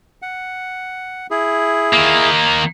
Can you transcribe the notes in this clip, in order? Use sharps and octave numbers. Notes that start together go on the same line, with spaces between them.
F#5
E4 G#4
D#3 A#3